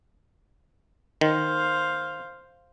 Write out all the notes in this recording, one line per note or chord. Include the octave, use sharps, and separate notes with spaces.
D#3 C5 F5